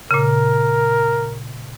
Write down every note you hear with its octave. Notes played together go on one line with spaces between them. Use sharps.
A#2 C#3 A#4